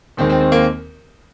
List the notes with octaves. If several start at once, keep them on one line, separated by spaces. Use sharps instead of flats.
D#2 D#3 G#3 C4
C4
C4
A#3